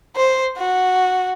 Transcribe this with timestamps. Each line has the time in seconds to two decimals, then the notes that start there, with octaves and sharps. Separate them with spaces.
0.16 C5
0.58 F#4